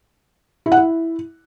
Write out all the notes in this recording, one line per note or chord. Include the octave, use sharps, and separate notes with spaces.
E4
F#5
E4